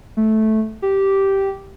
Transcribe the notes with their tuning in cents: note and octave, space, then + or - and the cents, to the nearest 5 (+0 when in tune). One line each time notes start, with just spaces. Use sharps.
A3 -10
G4 -10